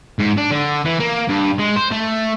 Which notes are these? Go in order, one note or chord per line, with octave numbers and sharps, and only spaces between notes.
G#2
D4
D3
E3
A#3
G2
G#3
C5
A3